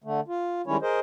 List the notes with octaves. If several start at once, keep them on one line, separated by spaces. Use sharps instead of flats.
D3 A3
F4
D#3 G3 G#3 C#4 E4 C#5
G#4 A#4 C5 D#5